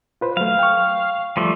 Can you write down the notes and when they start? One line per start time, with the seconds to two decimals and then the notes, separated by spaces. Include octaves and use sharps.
0.21 F4 B4 C5
0.37 F#3 A3 F5
0.59 G5 C#6
1.37 F3 G3 A3